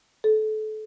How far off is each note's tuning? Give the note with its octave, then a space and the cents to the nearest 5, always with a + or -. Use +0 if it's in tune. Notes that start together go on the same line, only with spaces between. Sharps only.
A4 -30